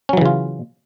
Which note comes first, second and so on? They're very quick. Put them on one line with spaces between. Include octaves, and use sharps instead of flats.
C#4 F#3 E3 C#3 F4